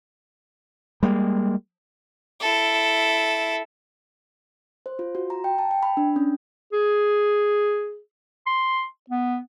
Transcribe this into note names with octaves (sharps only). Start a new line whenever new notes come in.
G3 G#3 A#3
E4 A4
C5
F4
F#4
A#5
G5
A5
G5
B5
D4
C#4
G#4
C6
B3